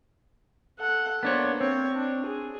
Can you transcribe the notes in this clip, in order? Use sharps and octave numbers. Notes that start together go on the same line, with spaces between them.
A4 F#5
A#3 B3 D4 C5 C#5
C4 C#5
D4
G#4